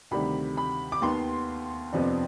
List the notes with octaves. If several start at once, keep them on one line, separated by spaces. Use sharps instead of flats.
D2 C3 D#3 G3 D4 B5
B5
D6
D#2 D#3 B3 C6
F2 C3 F3 B3 D4